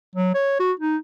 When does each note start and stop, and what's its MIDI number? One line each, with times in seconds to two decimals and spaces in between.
0.15 0.34 54
0.34 0.58 73
0.60 0.72 66
0.80 0.97 63